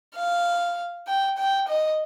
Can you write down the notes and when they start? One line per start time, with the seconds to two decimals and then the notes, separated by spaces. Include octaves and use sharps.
0.16 F5
1.07 G5
1.38 G5
1.68 D#5